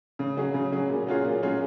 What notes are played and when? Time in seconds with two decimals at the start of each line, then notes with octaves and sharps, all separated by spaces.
0.19 C#3
0.37 F#3 C#4 G#4
0.54 C#3
0.72 F#3 C#4 G#4
0.89 A#2
1.07 F#3 C#4 F4 G#4
1.24 A#2
1.43 F#3 C#4 F4 G#4